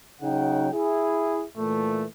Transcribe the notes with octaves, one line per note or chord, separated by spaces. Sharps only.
C#3 F#3 D#4 F#5 G5
E4 G#4
A#2 E3 A3